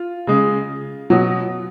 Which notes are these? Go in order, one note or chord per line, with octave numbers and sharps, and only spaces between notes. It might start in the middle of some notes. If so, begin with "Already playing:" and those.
Already playing: F4
C#3 G#3
B2 F#3